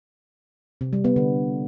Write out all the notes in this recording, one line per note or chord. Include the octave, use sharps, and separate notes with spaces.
C3
G3
B3
D3